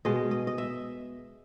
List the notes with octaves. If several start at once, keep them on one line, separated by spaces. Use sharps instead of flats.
B2 G#3 D#5
D#5
D#5
E5